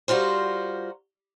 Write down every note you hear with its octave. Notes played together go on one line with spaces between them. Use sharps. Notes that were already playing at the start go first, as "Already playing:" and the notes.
G3 F4 F#4 A#4 C5